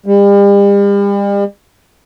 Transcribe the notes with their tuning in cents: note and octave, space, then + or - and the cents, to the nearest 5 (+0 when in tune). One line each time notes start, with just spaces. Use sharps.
G3 +40